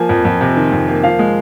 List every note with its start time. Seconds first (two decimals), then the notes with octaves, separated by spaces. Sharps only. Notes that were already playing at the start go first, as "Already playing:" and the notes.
Already playing: F3 A#3 G#5
0.09 F2
0.25 F2
0.41 C3
0.57 D#3
0.72 F2
0.88 A#3
1.04 F3 F5
1.19 G#3